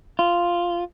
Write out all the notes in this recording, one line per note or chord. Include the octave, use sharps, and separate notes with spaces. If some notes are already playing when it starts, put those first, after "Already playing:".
F4